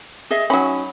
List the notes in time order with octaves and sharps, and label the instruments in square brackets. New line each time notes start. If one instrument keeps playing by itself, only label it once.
[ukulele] G#4 D#5 E5
[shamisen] F#3 C#4 [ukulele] D#4 B5